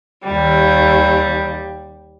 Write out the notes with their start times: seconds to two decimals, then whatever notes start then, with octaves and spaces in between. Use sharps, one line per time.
0.24 D#2 G3